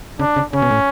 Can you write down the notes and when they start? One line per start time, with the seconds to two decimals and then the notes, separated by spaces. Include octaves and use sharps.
0.19 C#3 D4
0.36 C#3
0.53 C#3 C#4
0.62 B2
0.71 A2